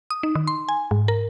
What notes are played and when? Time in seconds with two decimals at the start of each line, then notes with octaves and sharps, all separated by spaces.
0.10 D#6
0.23 D#4
0.35 D#3
0.47 C6
0.69 G#5
0.91 G#2
1.08 A#4